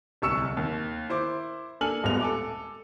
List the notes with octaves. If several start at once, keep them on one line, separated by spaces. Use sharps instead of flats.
D1 C2 C#6 E6 C#7 E7
D#2
E4 C5 D6
A#3 D4 A4 G#5 F6 F#7
D#1 G#1 G#3 B3 F7
A4 G#5 D6